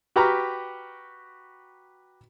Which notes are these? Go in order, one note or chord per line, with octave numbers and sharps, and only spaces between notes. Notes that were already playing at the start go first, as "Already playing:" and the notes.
F#4 G4 B4 G5 A#5 F6